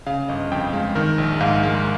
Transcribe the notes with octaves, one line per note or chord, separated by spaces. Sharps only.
C#3 F5
G1 D#5
F2 G5
G#3 F5
D#3 A#4
A#1
G#2 F5
G#3